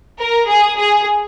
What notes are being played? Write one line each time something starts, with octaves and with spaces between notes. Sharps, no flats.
A#4
G#4
G#4